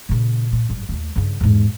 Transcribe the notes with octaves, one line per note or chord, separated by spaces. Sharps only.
A#2 C#3
A#2
F#1 G2
D#2 A3
G2 C#3
E2 G#2